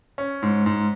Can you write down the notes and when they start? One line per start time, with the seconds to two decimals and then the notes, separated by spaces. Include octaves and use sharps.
0.18 C#4
0.42 G#2
0.66 G#2